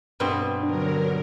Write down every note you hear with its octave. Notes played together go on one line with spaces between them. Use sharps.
G2 B2 C4
D3 F#3 D4 A#4